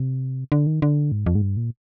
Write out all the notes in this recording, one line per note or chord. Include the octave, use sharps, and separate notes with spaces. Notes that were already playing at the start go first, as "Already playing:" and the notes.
Already playing: C3
D3
D#3
D3
G#2
F2
G#2
G2
A#2